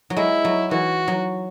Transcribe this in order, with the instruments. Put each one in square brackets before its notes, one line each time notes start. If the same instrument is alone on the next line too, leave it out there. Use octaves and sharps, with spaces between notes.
[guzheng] F#3
[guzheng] G#3 [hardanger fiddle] E4
[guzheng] F#3
[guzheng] E3 [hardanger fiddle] F#4
[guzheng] F#3